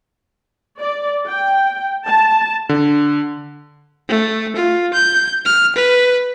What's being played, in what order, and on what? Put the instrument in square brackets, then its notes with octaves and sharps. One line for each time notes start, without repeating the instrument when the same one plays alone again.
[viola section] D5
G5
A5
[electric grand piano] D3
[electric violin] A3
F4
G6
F6
B4